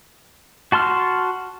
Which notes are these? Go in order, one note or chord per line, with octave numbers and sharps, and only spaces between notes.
F#4 A5 C6 F6